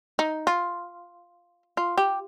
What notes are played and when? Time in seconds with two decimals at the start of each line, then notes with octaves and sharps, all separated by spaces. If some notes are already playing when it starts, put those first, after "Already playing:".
0.19 D#4
0.47 F4
1.77 F4
1.98 G4